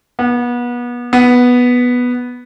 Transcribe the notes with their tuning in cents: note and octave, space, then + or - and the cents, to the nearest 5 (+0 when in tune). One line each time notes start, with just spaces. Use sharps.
B3 -30
B3 -5